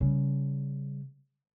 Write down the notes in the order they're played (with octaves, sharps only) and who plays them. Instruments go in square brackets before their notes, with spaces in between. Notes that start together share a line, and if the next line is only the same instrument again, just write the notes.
[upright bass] C#3 G3